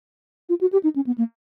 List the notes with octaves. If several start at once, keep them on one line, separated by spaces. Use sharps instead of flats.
F4
F#4
G4
D#4
C#4
B3
A#3